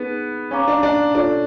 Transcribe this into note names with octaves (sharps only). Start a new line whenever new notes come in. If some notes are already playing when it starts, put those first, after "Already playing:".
Already playing: B3 D#4 G#4 B4
C#4 C#5 F5 A#5 D6
D4
D4
D4 F4 A4 C#5